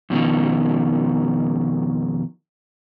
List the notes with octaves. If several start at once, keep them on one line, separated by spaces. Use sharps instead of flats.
F2 B2 D3 D#3